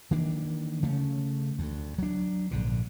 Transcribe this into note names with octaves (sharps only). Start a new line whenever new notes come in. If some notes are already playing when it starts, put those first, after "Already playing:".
D#3 E3 A#3 D4
C#3 A3 B3 C#4
D2
F#3 D4
A#1 G#2 D3